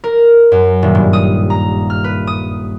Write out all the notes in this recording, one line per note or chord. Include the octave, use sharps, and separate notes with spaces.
A#4
F#2
D#1
G2
D#6
A#5
F6
B4
D#6